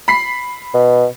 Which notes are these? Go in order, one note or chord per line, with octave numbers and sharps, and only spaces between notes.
B5 B6 C7
B2